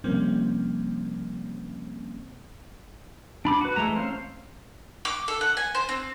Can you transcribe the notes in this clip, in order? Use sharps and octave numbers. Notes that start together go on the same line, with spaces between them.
C3 F3 G3 A#3 C4 C#4
D4 B5 D6
F#4 B4
E3 G#3 A3 A#5
C4 C#4 C5 F5
D6
A4
F#5
G#5
C5
C4